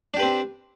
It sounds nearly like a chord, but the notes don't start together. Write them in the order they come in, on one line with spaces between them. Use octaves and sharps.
D4 G4 B4 C4